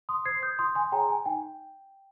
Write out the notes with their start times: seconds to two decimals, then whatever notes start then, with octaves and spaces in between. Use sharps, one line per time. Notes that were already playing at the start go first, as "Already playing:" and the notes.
0.09 C6 D#6
0.25 C5 G#6 C7
0.42 D#6 G6
0.59 F4 C6 D#6
0.75 G#5 C6
0.92 G#4 C#5 G5 A#5
1.09 G#5
1.25 D#4 G5